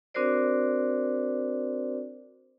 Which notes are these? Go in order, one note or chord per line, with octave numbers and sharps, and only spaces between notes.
C4 D4 F#4 A#4 C5 D5